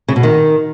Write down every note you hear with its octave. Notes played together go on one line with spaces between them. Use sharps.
C#3
B2
D#3